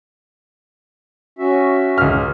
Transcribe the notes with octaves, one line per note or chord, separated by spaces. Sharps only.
C#4 F#4 E5
C#2 F6